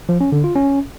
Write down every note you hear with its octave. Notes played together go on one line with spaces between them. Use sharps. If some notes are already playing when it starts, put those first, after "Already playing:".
F3
C#4
D3
F4
C#4